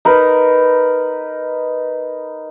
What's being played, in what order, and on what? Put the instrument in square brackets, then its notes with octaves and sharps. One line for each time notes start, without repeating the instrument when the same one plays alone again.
[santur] D#4 A#4 B4